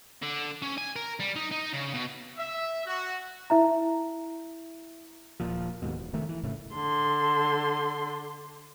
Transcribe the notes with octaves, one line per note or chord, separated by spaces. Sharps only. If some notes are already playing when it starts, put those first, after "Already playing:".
D3
C#4
G#5
A#4
G3
D#4
D#4
C#3
B2
E5
F#4
E4 E5 A#5
D#1 A#2 F3
D#2 G#2 B2
E1
F1 D#3 A3
E3
F1 A2 C#3 A3
D3 C6